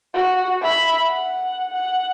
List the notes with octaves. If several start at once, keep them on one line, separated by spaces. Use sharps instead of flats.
F#4
E5 B5
F#5
F#5